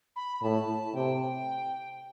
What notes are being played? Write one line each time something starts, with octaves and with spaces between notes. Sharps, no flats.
B5
A2 A5
C3 G5